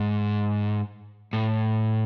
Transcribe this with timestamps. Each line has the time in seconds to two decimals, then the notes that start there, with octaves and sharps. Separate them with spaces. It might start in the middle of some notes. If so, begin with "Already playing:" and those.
Already playing: G#2
1.33 A2